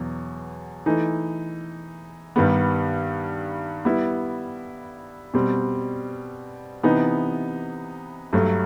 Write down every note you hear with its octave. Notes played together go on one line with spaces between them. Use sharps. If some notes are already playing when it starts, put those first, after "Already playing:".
Already playing: E2 B2 F#3
E3 A3 D#4
G2 D#3 G3 B3
G3 B3 E4
B2 G3 C4
C3 E3 B3 D#4
G2 F#3 A3